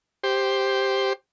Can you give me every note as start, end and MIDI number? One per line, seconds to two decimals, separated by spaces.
0.23 1.13 67
0.23 1.13 72